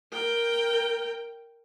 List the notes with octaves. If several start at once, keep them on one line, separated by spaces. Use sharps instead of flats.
A#4 G5